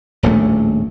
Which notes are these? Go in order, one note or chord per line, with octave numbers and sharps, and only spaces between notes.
D#1 A#1 A2 A3